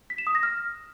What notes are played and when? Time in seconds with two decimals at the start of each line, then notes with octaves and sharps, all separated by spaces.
0.10 B6
0.18 E7
0.27 D#6
0.35 A#6
0.43 F6